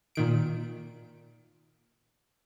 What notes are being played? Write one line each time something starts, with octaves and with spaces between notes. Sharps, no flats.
A#2 D#3 D7